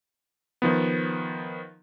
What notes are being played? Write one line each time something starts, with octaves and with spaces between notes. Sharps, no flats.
D#3 F3 B3